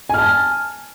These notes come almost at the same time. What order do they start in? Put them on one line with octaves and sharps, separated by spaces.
G#5 F6 A5